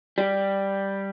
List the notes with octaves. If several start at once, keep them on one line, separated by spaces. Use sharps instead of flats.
G3